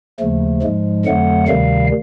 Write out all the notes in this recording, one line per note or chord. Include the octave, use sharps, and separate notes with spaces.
D#2 C#3 F3 A3
G#2 F3 G#3
F2 D3 F#3 A3 F#5
D2 C3 D#3 G3 F5